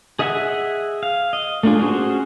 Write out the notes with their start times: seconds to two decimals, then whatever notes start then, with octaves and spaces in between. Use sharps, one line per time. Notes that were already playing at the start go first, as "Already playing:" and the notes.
0.19 G#4 D#5 E5 F#5 G#5
1.03 F5
1.33 D#5
1.63 A3 A#3 D4 F4 G#4
1.79 C#4 F#4 G#4 C5